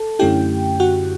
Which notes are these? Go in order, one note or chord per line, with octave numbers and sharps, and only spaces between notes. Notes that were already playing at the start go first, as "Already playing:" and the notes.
Already playing: A4 A5
F#2 D3 A3 C#4 E4 G4 G5
F#4 F#5